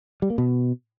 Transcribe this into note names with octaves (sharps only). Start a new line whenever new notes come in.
G3
A#3
B2